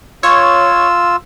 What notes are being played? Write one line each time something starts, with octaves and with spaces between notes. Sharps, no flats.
F4 C#5 E6